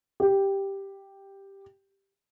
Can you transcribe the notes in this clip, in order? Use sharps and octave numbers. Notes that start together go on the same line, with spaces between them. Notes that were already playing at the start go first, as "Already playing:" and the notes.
G4